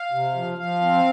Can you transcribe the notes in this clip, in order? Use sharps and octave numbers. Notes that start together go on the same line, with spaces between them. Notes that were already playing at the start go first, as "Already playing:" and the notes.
Already playing: F5
C3
F3
F3 F5
C4